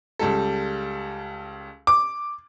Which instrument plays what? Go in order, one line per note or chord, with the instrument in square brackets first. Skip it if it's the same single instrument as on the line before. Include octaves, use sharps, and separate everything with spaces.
[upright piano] C#2 G3 A4
[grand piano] D6